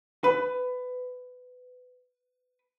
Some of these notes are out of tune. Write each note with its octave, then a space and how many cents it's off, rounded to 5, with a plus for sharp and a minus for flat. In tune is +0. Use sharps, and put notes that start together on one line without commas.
B4 +20